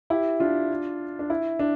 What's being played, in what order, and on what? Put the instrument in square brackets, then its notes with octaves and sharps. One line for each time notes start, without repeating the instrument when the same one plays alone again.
[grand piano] E4 G4
D4 F4
D4
E4
D4